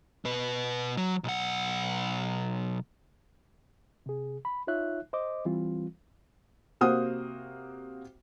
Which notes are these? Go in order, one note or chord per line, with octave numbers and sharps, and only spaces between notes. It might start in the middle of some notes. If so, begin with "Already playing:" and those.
B2 B4
F#3
B1 F#5
C3 G#4
B5
D#4 F4 C#5 E5 F#6
C5 D#5 D6
E3 G3 C4 F4
C3 A#3 F#4 C5 F#5 D#6